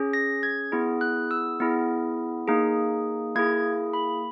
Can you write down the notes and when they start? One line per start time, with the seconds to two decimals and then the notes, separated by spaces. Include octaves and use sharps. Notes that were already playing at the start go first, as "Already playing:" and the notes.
Already playing: C#4 G#4
0.13 A#6
0.43 G#6
0.72 B3 E4 G#4
1.01 F#6
1.31 E6
1.60 B3 E4 G#4
2.48 A#3 D#4 G#4
3.36 A#3 E4 G#4 G#6
3.93 B5